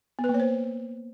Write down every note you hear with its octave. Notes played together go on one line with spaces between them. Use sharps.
B3
B4
A#3
C#5
C5